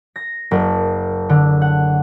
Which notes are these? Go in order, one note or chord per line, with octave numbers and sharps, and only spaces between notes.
A#6
F#1
D3
F#5